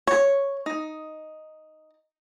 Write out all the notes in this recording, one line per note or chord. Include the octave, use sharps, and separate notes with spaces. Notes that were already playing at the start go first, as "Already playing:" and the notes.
C#5
D#4